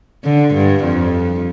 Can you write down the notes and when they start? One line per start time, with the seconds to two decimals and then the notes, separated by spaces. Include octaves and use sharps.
0.24 D3
0.54 G2
0.84 F2